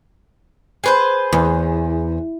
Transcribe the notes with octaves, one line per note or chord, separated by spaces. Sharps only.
G#4 B4 C5
E2